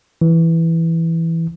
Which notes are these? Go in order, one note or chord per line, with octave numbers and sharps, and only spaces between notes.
E3